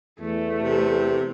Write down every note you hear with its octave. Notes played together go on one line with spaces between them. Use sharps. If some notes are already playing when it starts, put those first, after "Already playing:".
E2 A3
C3 G4